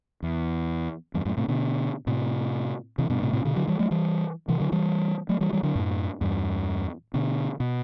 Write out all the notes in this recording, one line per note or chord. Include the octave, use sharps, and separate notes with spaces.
E2
E2 G2
F#2 A2
A2 C3
B2 D3
A2 C3
C3 E3
G2 B2
A2 C3
A2 C3
B2 D3
D3 F#3
E3 G3
F#3 A3
E3 G3
C3 E3
D3 F#3
E3 G3
F#3 A3
E3 G3
E3 G3
D3 F#3
F#2 A2
E2 G2
B2 D3
B2